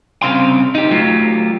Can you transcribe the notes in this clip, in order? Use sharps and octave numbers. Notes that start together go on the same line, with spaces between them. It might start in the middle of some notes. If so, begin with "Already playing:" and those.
C2 G2 C#3 C4 F5 C6
D#4 G4
F#3 A3 F4 G4